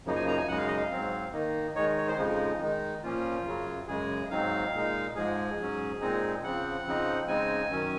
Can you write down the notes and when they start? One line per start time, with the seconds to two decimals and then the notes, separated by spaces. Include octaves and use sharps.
0.06 F#2 C#3 F3 A#3 D#4
0.16 G#5
0.27 A#5
0.38 G#5
0.48 F#2 C#3 G#3 D#4 F#5
0.57 F5
0.67 D#5
0.76 F5
0.91 G#2 F#3 C4
1.33 D#3 A#3 D#4
1.75 D#3 G#3 D#4 C#5
1.97 C#5
2.08 C5
2.18 F2 C#3 F3 G#3 D#4
2.60 D#3 G#3 D#4
3.03 A#2 F3 A#3 C#4 F4
3.46 F#2 C#3 F#3
3.88 F#2 C#3 G#3 G#4
4.30 G#2 F#3 C4 D#4 F5
4.73 A#2 G#3 D#4
5.16 G#2 F3 G#3 G#4
5.58 G#2 F#3 C#4
6.01 A#2 G#3 C4 D#4
6.43 C#3 F3 C4 F#5
6.86 C#3 F3 C4 D#4
7.28 C#3 G#3 C4 D#4 G#5
7.71 F#2 D#3 F#3 C#4